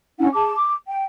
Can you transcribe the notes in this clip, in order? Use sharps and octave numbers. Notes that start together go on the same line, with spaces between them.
C#4 D4 E4 F#5
G#4 A5 D6
D6
G5